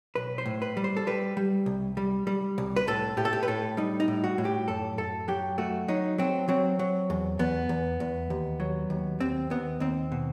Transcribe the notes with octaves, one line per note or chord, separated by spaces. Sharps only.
B1 B4
C5
A2
B4
G3
C5
A4
G3 B4
G3
C2
G3
G3
C2
B4
A2 A4
A2 G4
A4
G4
B4
A2 A4
G3 D#4
D#4
A2
F#4
A2
G4
F#2 A4
F#2 A4
F#3 G4
A3 F#4
F#3 D#4
F#3 C4
F#3 C4
F#3
E2
E2 B3
E2
E2
D#2
F#3
D#2
D#2 C4
D#2 B3
D#2 C4
B2